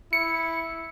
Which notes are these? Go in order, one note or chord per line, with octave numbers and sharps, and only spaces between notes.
E4 C#7